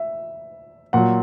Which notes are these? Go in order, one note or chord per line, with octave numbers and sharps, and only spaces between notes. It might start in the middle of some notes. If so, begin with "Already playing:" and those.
Already playing: E5
A#2 F#3 F#5